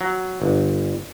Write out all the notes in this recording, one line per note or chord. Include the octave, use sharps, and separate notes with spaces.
F#3
G1